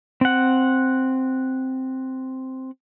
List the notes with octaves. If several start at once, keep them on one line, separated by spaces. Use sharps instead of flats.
C4 F#5